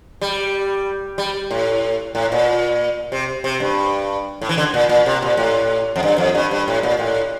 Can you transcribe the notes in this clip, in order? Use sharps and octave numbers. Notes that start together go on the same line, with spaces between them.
G3
G3
A2
A2
A#2
C3
C3
G2
A2
E3
D3
A#2
A#2
C3
A#2
A2
F2
G2
F2
G2
G2
A2
A#2
A2